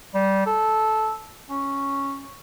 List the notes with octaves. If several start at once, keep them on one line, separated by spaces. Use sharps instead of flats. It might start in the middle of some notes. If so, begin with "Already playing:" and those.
G3
A4
C#4